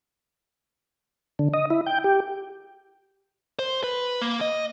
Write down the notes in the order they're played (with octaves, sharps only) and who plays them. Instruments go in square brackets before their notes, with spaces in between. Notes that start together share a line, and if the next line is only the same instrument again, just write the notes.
[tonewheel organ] D3
D#5
E4
G5
G4
[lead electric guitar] C5
B4
A#3
D#5